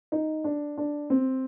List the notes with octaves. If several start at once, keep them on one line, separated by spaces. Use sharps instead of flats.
D#4
D4
D4
C4